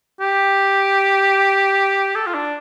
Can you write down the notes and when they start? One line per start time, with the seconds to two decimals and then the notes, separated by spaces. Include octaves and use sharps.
0.21 G4
2.16 A4
2.26 F4
2.34 D4